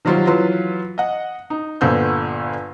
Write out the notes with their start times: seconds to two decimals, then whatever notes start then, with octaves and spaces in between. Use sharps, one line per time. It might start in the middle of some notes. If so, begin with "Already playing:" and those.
0.05 D#3 F#3 G3 F4 F#4 C5
0.27 E3 F#3 F4 B4 C6
0.98 D#5 F#5
1.50 D#4
1.81 G1 A#2 D3 B3 C5 G6